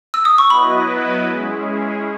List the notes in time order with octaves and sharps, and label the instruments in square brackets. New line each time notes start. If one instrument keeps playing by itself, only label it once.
[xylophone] E6
D#6
C#6
[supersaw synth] F#3 B3 E4 B4 D#5 [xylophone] B5
[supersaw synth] G#3 C#4 E4 G#4